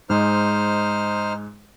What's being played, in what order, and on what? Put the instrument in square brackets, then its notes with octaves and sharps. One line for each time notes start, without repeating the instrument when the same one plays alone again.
[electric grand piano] G#2 G#3 [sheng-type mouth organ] D#4 C5 F6